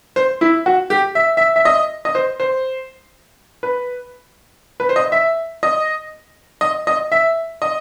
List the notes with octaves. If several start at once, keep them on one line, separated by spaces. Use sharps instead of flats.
C5
E4
F#4
G4
E5
E5
E5
D#5
D#5
C5
C5
B4
B4
C5
D#5
E5
D#5
D#5
D#5
E5
D#5